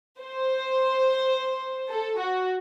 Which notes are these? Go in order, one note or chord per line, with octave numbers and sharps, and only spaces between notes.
C5
A4
F#4